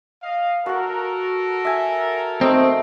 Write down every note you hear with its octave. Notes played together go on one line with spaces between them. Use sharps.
D#5 F5
F#4 A4 A#4 F#5
E5 G#5
A3 C4 D#4